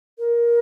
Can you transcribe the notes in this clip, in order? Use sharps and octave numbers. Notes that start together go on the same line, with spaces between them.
A#4